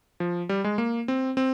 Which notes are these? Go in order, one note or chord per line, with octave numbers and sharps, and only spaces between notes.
F3
G3
G#3
A#3
C4
C4